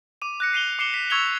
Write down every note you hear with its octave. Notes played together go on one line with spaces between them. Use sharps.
D6 D#7
F#6 A#6 C#7
C7 D#7 F7 G7
D6 C7 C#7 E7 G7
B6
C#6 E6 G#6 C#7 F7 G7